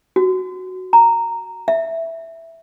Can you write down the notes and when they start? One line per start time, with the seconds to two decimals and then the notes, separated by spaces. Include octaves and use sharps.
0.16 F#4
0.93 A#5
1.68 E5